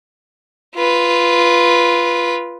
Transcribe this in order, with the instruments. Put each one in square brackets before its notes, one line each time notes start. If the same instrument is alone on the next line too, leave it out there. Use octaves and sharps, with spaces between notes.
[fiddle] F4 B4